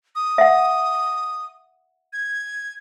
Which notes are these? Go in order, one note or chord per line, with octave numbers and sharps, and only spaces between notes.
D#6
E5 F#5
G#6